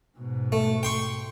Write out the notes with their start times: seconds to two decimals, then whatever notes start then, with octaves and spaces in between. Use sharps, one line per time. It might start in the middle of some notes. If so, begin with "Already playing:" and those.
0.18 G#2 B2
0.52 A3
0.83 G5 C6 C#6